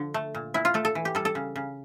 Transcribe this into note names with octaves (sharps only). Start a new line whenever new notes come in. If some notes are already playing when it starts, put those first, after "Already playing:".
Already playing: D3 F3
A3
A#2
A#2 E4
F4
A3 A4
A4
E3
G4
G3 A4
A4
C#3
C#3